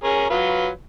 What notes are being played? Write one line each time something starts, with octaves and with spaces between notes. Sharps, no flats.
C#4 G#4 A#4
F#3 F4 B4